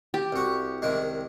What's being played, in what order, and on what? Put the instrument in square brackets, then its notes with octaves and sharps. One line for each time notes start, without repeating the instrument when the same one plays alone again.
[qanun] G4
[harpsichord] C2 F#4
C2 D#3 G#3